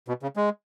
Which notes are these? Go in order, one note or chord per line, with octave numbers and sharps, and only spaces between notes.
B2
C#3
G#3